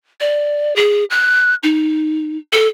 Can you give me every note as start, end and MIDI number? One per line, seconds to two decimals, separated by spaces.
0.20 0.76 74
0.76 1.04 68
1.10 1.55 90
1.63 2.37 63
2.53 2.67 69